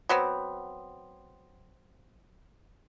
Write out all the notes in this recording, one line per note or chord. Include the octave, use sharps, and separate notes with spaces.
F#3 B3 C4